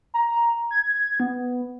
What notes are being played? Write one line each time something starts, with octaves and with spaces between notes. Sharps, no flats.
A#5
G#6
B3